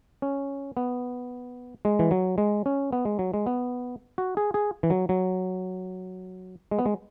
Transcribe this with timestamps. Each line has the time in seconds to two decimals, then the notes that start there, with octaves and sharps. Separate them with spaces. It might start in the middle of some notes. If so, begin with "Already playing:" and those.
0.22 C#4
0.77 B3
1.85 G#3
1.99 E3
2.11 F#3
2.38 G#3
2.66 C#4
2.93 B3
3.05 G#3
3.19 F#3
3.34 G#3
3.46 B3
4.18 F#4
4.37 G#4
4.54 G#4
4.83 E3
4.90 F#3
5.09 F#3
6.71 G#3
6.79 B3
6.86 G#3